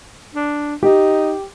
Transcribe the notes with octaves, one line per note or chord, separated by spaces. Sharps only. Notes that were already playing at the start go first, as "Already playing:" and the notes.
D4
D#4 G4